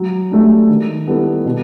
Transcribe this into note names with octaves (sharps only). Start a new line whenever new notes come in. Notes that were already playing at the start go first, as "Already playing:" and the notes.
Already playing: F#3
A3 D4 G4
D#3
G3 B3 E4 A4
B2